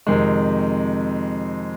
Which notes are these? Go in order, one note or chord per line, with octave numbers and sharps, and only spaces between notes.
F2 C3 D#3 G#3